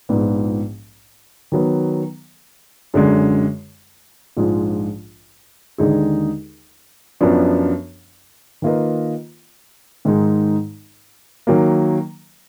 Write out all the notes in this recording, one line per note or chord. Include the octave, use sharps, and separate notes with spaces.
A#1 G#2 F3 B3
D#3 F#3 B3
F#2 D3 G#3
A#1 G#2 F3 G#3
D#2 D3 G#3 D#4 G#4
F#2 F3 B3 D4
D#3 A#3 F4 B4 D#5
G#2 D#3 G#3 D#4
D#3 F#3 A#3